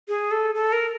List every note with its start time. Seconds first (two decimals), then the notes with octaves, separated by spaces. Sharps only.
0.08 G#4
0.31 A4
0.55 A4
0.73 A#4